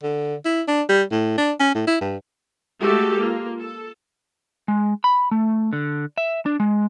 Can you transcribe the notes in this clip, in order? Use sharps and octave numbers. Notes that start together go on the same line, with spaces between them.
D3
E4
D4
G3
A2
D4
C#4
A2
E4
G2
G#3 A3 F#4 G4 A4
A#3 F4
A4
G#3
B5
A3
D3
E5
D4
G#3